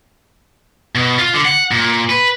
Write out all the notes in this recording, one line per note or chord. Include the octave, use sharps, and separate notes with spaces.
B2
F4
D3
F#5
A#2
B4